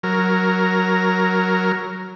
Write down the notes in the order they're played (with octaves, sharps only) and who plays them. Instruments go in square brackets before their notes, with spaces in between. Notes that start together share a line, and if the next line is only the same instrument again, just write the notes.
[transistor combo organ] F#3 A#4